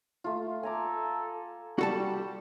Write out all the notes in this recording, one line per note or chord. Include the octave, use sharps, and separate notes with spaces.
A3 F4
A4 G#5 A#5 D6
G3 F#4 A4 A5